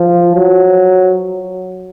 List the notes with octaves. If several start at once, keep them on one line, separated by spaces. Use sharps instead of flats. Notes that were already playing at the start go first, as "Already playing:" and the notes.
Already playing: F3
F#3